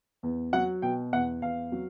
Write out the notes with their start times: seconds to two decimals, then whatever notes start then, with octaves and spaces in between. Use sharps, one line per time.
0.23 E2
0.53 F#3 F#5
0.82 B2 G5
1.13 E2 F#5
1.42 E2 F5
1.72 F#3